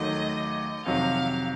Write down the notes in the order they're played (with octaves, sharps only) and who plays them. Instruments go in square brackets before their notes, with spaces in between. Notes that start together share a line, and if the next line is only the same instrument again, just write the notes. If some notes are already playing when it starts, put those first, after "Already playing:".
Already playing: [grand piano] D#2 D#3 F#3 A3 [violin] D#5
[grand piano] F2 C3 D#3 F#3 [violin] F5